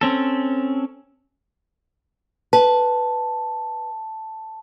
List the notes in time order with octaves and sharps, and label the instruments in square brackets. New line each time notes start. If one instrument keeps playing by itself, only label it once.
[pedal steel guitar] C4 C#4 A4
[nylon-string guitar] B4 [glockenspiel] A5